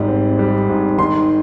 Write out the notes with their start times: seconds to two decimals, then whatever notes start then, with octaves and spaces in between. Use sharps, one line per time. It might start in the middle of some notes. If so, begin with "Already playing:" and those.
Already playing: G#1 G#2 G3
0.08 C4
0.39 G3
0.69 G#2
0.98 D#3 C6